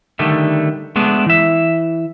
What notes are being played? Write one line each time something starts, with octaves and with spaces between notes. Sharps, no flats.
D3 D#3 G3 A3
G#3 A3 B3 D4
E3 E5